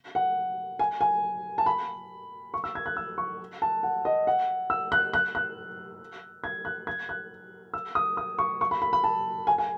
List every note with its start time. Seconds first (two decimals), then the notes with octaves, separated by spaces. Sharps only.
0.15 F#5
0.79 G#5
1.01 G#5
1.58 A5
1.66 B5
2.54 C#6
2.64 E6
2.75 G#6
2.86 F#6
2.97 E6
3.18 C#6
3.62 A5
3.83 F#5
4.05 D#5
4.27 F#5
4.70 E6
4.92 F#6
5.13 F#6
5.35 F#6
6.44 G#6
6.65 F#6
6.87 G#6
7.09 F#6
7.74 E6
7.95 D#6
8.17 D#6
8.39 C#6
8.61 C#6
8.71 B5
8.82 B5
8.93 B5
9.04 A5
9.47 G#5
9.58 G#5